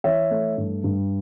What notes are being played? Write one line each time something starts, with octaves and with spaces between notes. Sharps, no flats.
E3 C#5 E5
A3
G2
G2